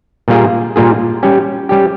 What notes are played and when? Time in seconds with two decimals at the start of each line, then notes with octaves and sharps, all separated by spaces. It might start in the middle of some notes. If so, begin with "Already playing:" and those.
0.28 A#2 G3 A#3 F4 G#4
0.76 A#2 G3 A#3 F4 G#4
1.23 G3 C#4 G4
1.69 G3 C#4 G4